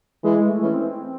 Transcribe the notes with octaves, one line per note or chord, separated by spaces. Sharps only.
E3 G#3
A3
E3 C#4
C4